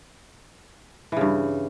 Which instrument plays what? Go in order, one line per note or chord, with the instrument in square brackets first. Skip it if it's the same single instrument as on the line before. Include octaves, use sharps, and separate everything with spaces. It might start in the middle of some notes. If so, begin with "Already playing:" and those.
[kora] E3
C#3
G2